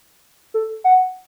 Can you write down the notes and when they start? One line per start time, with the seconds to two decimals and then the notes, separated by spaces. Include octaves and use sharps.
0.54 A4
0.84 F#5